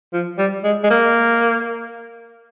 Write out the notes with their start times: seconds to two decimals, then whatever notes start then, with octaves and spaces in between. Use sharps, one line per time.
0.13 F3
0.38 G3
0.64 G#3
0.84 G#3
0.90 A#3